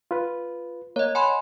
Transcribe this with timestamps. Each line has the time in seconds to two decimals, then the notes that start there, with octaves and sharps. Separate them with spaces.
0.11 F4 B4
0.96 A#3 C#5 D#5
1.15 F#5 G#5 B5 C6